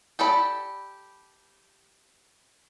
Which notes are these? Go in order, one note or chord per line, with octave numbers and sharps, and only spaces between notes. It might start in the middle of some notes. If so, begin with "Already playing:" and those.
G4 A4 D5 B5